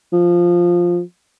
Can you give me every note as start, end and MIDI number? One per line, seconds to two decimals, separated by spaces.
0.12 1.00 53